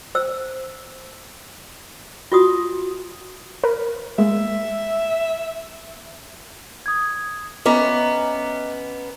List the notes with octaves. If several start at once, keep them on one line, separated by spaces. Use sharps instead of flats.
C5 E6
F4 F#4 D#6
A#4 B4
G#3 A#3 E5
D#6 G#6
B3 C#4 D#5 E5 A#5 D6